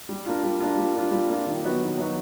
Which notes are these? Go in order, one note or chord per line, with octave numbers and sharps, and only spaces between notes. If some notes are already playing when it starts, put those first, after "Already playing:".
G3
A#3 D4 F4
G3
A#3 D4 F4
G3
A#3 D4 F4
G3
A#3 D4 F4
D#3
F#3 B3 D#4 F#4
D#3
F#3 B3 D#4 F#4